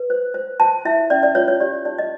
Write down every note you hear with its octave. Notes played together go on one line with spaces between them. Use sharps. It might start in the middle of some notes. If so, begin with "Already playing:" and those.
Already playing: B4
C5
C5
C5 A5
E4 E5
C#4 D5
D5
F4 C#5
C#5
G4 D5
D#4 D5
D#5